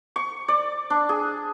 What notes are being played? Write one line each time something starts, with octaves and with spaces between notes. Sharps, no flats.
C#6
D5
D4
G#4